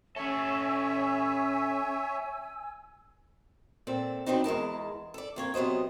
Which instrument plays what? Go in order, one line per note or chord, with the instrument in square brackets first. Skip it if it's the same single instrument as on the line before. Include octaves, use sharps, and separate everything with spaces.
[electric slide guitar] C#4 A4 [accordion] C#5 E5 [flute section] G#5 E6
[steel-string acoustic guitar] A#2 C4 A4
F#3 B3 C4 D4 D#4
E2 G#3 A#4 A5
A4 D5
F2 A#3 C#5
C3 F#3 B3 C5 D#5